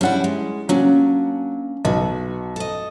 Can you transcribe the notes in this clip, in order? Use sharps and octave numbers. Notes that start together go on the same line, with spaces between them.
G3 C#4 D4 E4 F#5
G#3
F#3 A#3 C#4 D4
B1 F#4
A4 D#5